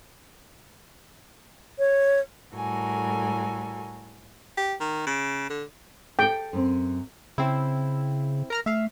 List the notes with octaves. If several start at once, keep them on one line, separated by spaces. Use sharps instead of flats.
C#5
A2 G3 F#4 A4 A#4 G#5
G4
D#3
C#3
D3
G#4 A4 G5
F#2 C4
C#3 C4 E4
A#4 A#5 F6
A3 E5 F5